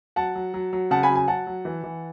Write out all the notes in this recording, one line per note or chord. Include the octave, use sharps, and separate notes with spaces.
F#3 F#5 A5
F#3
F#3
F#3
C#3 F#5 A5
G#5 B5
F#3
G#5
F#3 F#5 A5
F#3
E3
E3